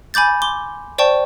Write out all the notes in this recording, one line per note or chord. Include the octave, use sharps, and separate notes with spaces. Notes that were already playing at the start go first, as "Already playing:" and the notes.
G#5 B5 D6 G6 A6
C6 D6 G7
C5 D5 G5 A5 C#6